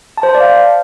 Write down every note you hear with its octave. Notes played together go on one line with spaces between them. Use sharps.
A5
C5
A5
D5
F5